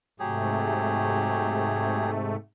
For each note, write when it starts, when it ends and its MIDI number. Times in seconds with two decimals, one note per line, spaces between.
0.20 2.36 44
0.20 2.36 48
0.20 2.11 54
0.20 2.36 57
0.20 2.11 67
0.20 2.11 68